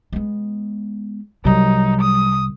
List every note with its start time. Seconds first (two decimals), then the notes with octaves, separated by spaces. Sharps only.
0.13 G#3 B3
1.45 C2 F#3 G3 D#4
2.01 D#6